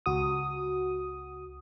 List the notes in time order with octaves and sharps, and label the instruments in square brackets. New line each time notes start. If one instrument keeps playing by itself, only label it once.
[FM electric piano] C#2 F#4 D#6